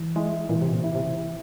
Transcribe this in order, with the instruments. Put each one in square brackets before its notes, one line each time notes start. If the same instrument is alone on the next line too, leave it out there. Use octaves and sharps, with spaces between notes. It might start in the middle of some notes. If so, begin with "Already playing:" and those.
Already playing: [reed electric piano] E3
[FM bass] G#3 [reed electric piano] E4
[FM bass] A#2 [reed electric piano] E3
[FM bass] C3
A#2
[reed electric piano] E4
[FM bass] C3